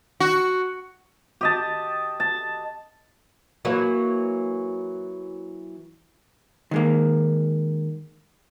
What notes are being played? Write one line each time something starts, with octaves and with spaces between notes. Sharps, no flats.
F#4
G4 D#5 A5
A5
E3 F#3 A#3
D#3 G#3 A#3